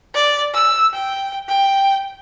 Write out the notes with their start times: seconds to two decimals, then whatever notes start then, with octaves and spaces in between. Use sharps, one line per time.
0.15 D5
0.54 E6
0.94 G5
1.48 G5